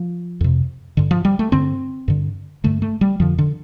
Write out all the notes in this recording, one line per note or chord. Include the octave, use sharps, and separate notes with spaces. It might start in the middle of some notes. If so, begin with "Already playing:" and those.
Already playing: F3
F2 C3
G2 D3
F3
G3
A3
G2 D3 C4
G2 D3
G2 D3 A3
A3
G3
F2 D3 F3
D3